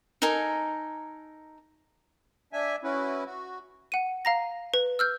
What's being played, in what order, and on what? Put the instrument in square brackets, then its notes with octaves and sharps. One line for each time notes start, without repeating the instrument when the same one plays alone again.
[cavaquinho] D#4 A4 A#4 G#5
[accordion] D4 E5 G#5
C#4 E4 F#4 B4
F#4
[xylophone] F#5 D#7
F5 A#5 A#6
B4
E6 F6 G6